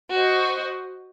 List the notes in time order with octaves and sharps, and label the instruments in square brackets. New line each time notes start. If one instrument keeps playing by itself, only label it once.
[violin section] F#4 C5 D#5